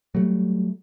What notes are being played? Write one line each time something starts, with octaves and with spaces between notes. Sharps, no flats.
F#3 G3 A3